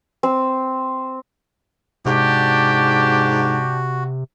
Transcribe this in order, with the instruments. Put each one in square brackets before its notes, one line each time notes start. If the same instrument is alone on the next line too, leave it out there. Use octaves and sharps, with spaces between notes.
[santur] C4
[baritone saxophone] G#2 [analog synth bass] C3 [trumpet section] D4 G4 [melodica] F#4